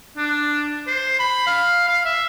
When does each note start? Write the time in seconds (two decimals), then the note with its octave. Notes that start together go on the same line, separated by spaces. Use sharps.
0.17 D4
0.87 C5
1.20 B5
1.47 F5
1.88 F5
2.05 E5